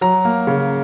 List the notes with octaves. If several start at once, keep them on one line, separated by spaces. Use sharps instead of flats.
F#3 A#5
A#3
C#3